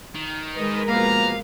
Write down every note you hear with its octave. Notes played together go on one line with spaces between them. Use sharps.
D#3
G#3 A#4 B4 D#5
B2 F3 A#3 F5 A#5